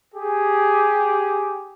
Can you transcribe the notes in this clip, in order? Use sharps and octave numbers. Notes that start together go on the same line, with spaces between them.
G4 G#4